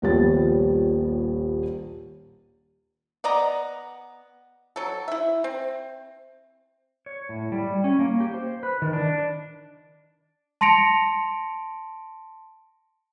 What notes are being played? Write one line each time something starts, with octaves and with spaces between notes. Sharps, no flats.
D#1 A#1 G3 B3 C#5 A6
B3 D5 D#5 A#5
F#3 A4
E4 E5
C4
C#5
A2
G3
C#4
A#3
G4
C5
B4
D#3
D4
A5 C6 A#6 C#7 D7 F7